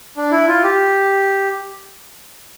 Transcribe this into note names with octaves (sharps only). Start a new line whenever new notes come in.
D4
E4
F4
G4